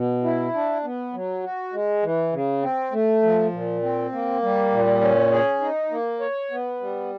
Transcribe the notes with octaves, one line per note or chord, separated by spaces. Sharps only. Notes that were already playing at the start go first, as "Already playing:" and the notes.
Already playing: B2
E4
D4
B3
F#3
F#4
G#3
E3
C#3
C4
A3
F3
A#2
C4
A#3
G3
A#2
C#4
G#4
D#4
A#3
C#5
B3
G3